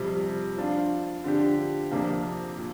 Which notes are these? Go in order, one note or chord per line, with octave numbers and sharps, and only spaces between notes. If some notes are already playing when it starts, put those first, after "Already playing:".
Already playing: F2 C3 G3
F3 D4 F4
D3 F3 D4 G4
F2 C3 A#3 D4
A#2